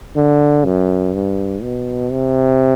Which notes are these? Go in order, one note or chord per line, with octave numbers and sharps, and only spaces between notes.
D3
F#2
G2
B2
C3